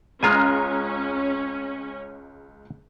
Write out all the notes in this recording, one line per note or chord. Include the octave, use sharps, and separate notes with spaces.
C#2 G#3 C#4 F4 G#5 A#5 F6